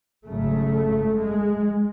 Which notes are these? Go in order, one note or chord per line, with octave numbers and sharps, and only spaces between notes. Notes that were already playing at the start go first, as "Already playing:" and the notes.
G#1 F#2 C#3 A3
G#3